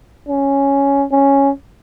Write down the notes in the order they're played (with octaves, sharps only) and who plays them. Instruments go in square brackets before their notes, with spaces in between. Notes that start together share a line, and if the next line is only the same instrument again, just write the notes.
[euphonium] C#4
C#4